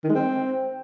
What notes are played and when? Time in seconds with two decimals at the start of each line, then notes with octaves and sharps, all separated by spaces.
0.04 D#3
0.09 G#3
0.15 C4